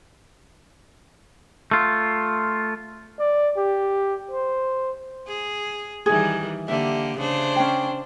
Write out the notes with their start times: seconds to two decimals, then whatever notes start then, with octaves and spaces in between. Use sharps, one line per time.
1.71 A3 F4
3.19 D5
3.57 G4
4.31 C5
5.27 G#4
6.06 D#3 E3 G3 G#4
6.68 D3 A#3 G4 E5
7.17 C#3 D4 C5
7.56 C#4 G5